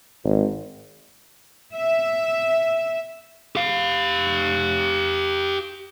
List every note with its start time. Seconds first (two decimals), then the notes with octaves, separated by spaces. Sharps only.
0.24 G#1
1.74 E5
3.56 G4 F5